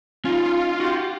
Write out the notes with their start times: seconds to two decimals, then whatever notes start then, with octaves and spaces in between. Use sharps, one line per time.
0.25 C#4 D#4 F4
0.80 F#4 G4